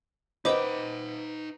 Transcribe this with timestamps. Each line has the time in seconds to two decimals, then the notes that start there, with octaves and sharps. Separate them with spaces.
0.45 D#4 B4 C5 D#5 F#5 G5 D6 G6